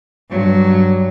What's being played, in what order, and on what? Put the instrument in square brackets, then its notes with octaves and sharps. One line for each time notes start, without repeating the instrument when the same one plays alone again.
[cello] G2 F#3